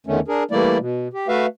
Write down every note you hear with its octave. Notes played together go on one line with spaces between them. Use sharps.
E2 D3 D#3 A3 C#4
D4 G#4 A#4
E3 G3 A3 A#3 E4 D5
B2
G4
A3 F#4 B4 E5 F5